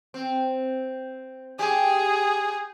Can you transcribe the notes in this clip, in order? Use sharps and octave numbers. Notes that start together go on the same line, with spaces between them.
C4
G4 G#4